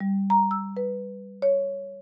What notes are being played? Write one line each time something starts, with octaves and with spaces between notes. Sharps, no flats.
G3
A#5
E6
B4
C#5